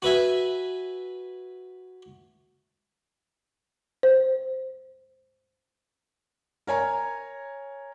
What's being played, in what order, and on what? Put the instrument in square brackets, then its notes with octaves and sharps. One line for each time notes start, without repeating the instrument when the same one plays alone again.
[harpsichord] F#4 B4 E5 G#5
[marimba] C5
[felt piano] A#4 C#5 G#5 A#5